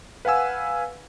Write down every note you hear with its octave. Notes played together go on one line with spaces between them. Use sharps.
B4 F5 F#5 G#5 E6